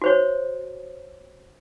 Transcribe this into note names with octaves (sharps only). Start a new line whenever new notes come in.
F#4 C5 C#5